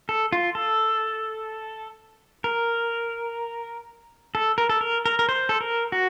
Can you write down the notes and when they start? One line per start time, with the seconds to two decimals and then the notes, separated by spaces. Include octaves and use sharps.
0.09 A4
0.32 F4
0.55 A4
2.44 A#4
4.35 A4
4.58 A#4
4.69 A4
4.81 A#4
5.06 A#4
5.19 A#4
5.29 C5
5.49 A4
5.61 A#4
5.92 F#4